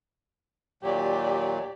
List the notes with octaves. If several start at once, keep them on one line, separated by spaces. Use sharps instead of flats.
D#2 A#2 F#3 G4 D5